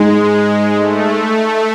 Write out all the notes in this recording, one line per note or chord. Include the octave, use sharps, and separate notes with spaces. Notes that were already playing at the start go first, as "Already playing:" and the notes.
Already playing: G#2 G#3
A3